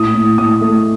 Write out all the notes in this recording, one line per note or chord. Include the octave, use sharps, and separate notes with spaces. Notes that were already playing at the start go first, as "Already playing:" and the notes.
Already playing: A2 D#6
A2
A2 D#6
A3